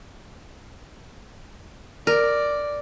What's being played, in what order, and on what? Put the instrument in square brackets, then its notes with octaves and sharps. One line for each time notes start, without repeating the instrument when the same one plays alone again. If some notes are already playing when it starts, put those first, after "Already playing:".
[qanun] A#4 [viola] D5